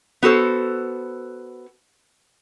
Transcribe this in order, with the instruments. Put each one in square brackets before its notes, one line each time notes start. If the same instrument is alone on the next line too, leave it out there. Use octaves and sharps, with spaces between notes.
[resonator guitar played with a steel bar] B3 F#4 A4 C5